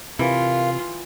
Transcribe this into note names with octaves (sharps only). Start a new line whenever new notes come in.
C3 E3 F4 A#4 F5